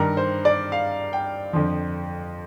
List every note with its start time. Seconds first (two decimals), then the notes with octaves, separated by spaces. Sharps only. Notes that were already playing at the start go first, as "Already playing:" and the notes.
Already playing: G2 D#3 G3 A#4
0.17 C5
0.45 D5
0.72 F5
1.13 G5
1.53 F2 D3 F3